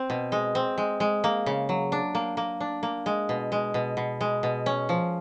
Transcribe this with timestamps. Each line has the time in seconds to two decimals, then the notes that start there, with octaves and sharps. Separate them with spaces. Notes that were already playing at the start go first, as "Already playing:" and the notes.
Already playing: C4
0.10 B2
0.32 G#3
0.55 C4
0.78 G#3
1.00 G#3
1.24 A#3
1.46 C#3
1.69 F#3
1.92 D4
2.15 A#3
2.37 A#3
2.60 D4
2.83 A#3
3.06 G#3
3.29 B2
3.52 G#3
3.74 B2
3.97 B2
4.21 G#3
4.43 B2
4.66 C#4
4.89 F3